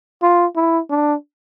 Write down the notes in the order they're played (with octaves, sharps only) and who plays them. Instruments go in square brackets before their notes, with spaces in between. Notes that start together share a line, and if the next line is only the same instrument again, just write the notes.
[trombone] F4
E4
D4